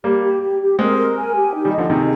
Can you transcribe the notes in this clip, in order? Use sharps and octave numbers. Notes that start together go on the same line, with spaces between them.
G3 A#3 G4
G4
G4
G4
G#3 C4 A#4
A#4
G#5
G4
D#4
D#3 G3
D#5
D3 F3
C3 D#3 G#4